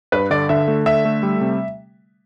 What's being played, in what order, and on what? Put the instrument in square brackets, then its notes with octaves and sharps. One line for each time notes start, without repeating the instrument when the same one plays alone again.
[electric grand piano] G2 [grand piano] B4
[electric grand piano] D3 [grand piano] D5
[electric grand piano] D3 [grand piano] E5
[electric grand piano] A3
[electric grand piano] D3 [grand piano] E5
[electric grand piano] A3
G3
C3